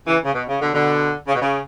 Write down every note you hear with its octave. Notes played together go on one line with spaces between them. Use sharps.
C#3 E3
C#3
B2
C#3
B2 D3
B2 D3
C#3
B2
C#3